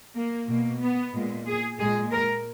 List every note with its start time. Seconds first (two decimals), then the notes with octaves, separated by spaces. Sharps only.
0.15 A#3
0.48 B2 A#3
0.81 B3
1.13 A#2 G#3
1.47 G#4
1.80 A#2 G#3 G#4
2.13 A#4